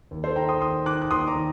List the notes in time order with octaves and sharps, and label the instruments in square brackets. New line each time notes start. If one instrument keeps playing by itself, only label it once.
[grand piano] D#2
A4 C5
D#3 G5 A#5
C6 D#6
D#2 C6 D#6
D#3 D6 F#6
F#6
D#2 C6 D#6
A#5 D6
D#3